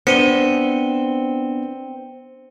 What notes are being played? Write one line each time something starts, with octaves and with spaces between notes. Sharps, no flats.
B3 C4 D4 C#7 D#7 G7